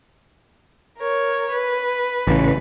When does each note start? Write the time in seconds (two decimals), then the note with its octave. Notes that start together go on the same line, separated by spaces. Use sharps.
0.98 A#4 C#5
1.52 B4
2.27 A1 C#3